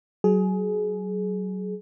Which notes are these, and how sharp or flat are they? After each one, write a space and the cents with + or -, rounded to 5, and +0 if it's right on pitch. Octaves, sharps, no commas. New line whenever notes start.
F#3 +25 G#4 +25